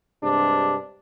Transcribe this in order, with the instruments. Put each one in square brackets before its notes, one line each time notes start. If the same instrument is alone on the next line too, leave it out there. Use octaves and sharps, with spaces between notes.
[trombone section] G2 C3 G#3 D4